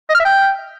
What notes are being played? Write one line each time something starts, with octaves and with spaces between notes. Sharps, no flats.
D#5
F6
E5
G5